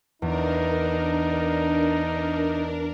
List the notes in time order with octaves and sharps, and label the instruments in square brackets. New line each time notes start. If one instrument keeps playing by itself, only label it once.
[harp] E2 [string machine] D4 A#4 [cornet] D#4